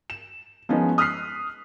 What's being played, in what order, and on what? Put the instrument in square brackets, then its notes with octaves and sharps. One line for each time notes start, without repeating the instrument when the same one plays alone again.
[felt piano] E7
F3 G#3 B3 C#4 D#4
D#6 F6 F#6 B6 C7